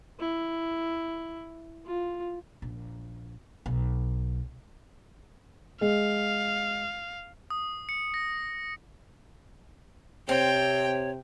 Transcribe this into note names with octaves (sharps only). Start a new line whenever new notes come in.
E4
F4
A#1
B1
G#3 F5
D#6
C#7
A#6
C3 C4 C#5 G5